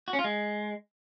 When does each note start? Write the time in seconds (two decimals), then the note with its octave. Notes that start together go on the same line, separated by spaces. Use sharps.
0.08 F#4
0.13 C#4
0.19 F4
0.24 G#3